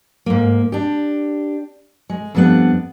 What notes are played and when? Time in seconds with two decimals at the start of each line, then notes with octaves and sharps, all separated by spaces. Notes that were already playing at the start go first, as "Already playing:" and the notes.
0.26 G#2 A#3
0.72 D4 G4
2.10 G#3
2.35 F2 G3 B3 D4 F#5